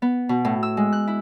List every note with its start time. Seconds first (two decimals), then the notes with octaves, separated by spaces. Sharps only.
0.02 B3
0.29 B2
0.45 A2
0.63 E6
0.77 G#3
0.93 F#6
1.07 E4